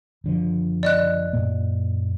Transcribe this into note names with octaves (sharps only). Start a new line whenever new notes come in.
F#1 D3 F3
D5 D#5 F#6
F#2 A#2 A#3